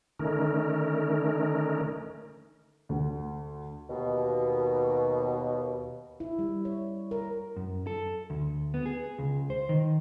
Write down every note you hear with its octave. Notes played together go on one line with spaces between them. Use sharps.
D3 D#3 A3 C#4 D#4 A#4
D2
D#2 B2
E4
G3
C#5
A#4
F#2
A4
D2
B3
G#4
C#2
C5
D#3